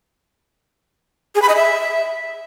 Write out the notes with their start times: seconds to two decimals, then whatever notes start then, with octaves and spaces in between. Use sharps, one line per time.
1.35 G#4
1.42 B5
1.49 D#5
1.56 E5